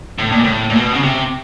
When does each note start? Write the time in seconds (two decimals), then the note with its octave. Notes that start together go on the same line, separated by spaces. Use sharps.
0.18 A2
0.32 A#2
0.44 A2
0.70 A#2
0.75 B2
0.94 C#3
1.03 C3